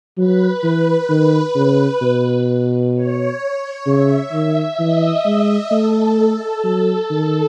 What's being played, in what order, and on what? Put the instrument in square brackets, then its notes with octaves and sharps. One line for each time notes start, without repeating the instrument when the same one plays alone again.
[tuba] F#3 [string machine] B4
[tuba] E3
D#3
C#3
B2
[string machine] C#5
[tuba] C#3 [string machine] E5
[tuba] D#3
[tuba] E3 [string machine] D#5
[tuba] G#3
[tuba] A3 [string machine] A4
[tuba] F#3
D#3